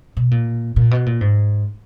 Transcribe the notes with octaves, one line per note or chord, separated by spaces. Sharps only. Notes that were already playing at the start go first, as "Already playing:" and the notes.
B2
A#2
A#2
B2
A#2
G#2